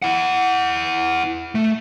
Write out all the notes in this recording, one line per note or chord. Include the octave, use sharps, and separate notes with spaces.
E4 F#5
A3